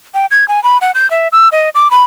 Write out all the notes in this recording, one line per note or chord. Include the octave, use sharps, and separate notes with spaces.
G5
G#6
G#5
B5
F#5
G6
E5
E6
D#5
D6
B5